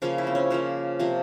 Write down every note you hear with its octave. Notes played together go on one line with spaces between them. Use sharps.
C#3 F3 A#3 C#4
E4
C4
C#4
C#3 F3 A#3
C3 F3 A#3